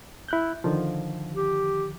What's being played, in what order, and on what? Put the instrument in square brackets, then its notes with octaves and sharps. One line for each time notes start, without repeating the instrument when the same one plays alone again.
[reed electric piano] E4 F#6 G6
D3 D#3 F3
[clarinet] G4